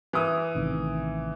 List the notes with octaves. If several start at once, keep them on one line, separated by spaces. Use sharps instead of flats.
E3 D#6
A1 C3 D#3